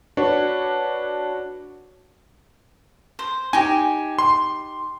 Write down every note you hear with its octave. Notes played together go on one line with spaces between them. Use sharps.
D4 F#4 B4 C#5
C5
D#4 G4 G#5
C6